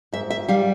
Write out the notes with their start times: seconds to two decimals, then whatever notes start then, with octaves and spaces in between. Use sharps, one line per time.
0.13 G#2 E5
0.30 E5
0.48 G3 F5